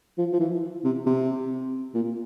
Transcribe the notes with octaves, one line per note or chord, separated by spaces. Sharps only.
F3
F3
E3
C3
C3
A#2